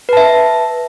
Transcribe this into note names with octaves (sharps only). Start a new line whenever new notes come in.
B4 E5 A5